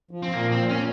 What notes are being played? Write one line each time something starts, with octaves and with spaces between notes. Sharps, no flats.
F3
C4
A#2 A#3
C4
A#2
C#4